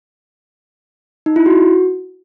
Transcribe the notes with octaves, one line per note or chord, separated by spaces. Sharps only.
D#4
E4
F#4